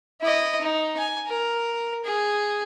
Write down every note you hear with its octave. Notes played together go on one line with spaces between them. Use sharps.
E4 D#5
D#4
G#5
A#4
G#4